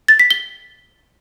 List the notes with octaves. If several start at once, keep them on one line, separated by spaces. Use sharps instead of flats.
A6
B6
G7